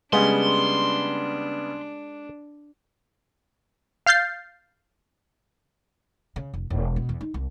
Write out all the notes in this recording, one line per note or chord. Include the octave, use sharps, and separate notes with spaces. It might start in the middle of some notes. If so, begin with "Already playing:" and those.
C#3 G3 G#3 B3 D4 G#4 G#5 C6
F5 F6 G6 A6 C7
C#3
F1
E1
B2
E2
D#4
C2